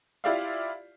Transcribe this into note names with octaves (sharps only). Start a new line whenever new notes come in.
E4 F4 G4 D5 E5 F5